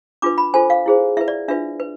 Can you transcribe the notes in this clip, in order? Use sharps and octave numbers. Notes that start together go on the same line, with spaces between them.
D4 F4 B4 D6
B5
F4 A4 C5 G#5
F5
E4 G#4 C5
E4 B4 E5
D5
D4 F4 B4 E5
B4